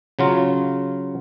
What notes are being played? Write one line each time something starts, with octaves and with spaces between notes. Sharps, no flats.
C#3 F#3 F4